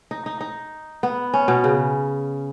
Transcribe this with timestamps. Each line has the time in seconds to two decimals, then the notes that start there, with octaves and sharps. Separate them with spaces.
0.11 D#4
0.26 D#4
0.41 D#4
1.03 B3
1.34 C#4
1.48 B2
1.64 C#3